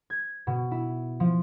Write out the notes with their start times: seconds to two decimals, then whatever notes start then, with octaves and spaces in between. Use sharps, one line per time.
0.10 G#6
0.47 B2
0.71 E4
1.20 F3